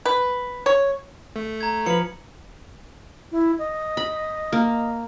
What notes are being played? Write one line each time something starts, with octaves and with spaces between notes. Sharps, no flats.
B4
C#5
A3
A#5 G#6
F3 B4 C#7 F#7
E4
D#5
B5
A#3